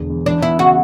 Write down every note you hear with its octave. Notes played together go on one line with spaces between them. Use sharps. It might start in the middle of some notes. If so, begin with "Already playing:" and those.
Already playing: E1 D3
E2
E3 D4
B3 E4
C#3 F#4